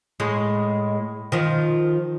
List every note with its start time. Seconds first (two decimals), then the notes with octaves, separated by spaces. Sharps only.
0.20 A2 G#3
1.32 D#3 F3